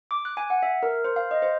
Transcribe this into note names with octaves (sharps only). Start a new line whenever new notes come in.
D6
F#6
G#5
F#5
E5
A#4
C5
F5
D#5
C5